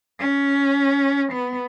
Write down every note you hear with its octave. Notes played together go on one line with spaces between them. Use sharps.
C#4
B3